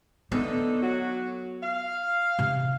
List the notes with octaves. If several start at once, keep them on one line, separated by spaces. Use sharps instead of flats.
D3 A3 B3 D#4
F#3 F#4
F5
C3